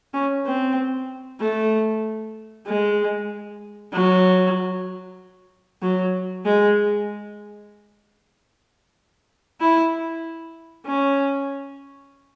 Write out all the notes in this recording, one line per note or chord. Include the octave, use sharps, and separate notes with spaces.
C#4
C4
A3
G#3
F#3
F#3
G#3
E4
C#4